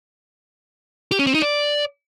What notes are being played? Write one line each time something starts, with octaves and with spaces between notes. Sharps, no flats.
G4
C#4
C4
D#4
D5